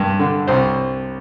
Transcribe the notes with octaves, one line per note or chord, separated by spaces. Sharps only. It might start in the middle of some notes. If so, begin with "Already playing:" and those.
Already playing: G2
D3
C2 C5